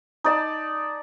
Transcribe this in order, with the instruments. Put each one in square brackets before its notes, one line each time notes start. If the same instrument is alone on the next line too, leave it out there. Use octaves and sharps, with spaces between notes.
[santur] D#4 D5 A5